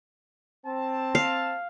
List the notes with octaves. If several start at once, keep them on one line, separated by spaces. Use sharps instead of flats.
C4 A5
F5